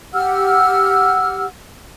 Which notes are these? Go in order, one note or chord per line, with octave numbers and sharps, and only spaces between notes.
G4 F#5 E6 F6